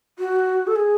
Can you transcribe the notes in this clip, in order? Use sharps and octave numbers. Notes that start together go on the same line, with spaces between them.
F#4
A4
G#4